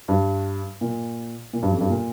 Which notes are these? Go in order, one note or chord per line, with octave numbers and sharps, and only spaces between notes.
G2
A#2
A#2
G2
F2
G2
A#2